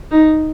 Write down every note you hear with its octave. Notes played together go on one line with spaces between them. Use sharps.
D#4